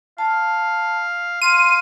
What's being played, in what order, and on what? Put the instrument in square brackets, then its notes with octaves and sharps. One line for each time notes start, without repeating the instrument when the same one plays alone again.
[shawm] F5 [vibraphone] A5
[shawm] F5 [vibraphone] C6 [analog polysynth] D#7